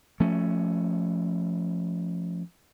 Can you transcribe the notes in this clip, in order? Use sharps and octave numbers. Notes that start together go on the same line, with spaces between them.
F3 A3 C#4